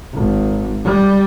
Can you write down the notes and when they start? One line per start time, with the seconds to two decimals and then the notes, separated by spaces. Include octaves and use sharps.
0.15 G#1
0.85 G3